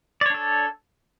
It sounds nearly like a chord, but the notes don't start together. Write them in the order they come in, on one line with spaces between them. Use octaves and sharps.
D5 C#5 D4 A4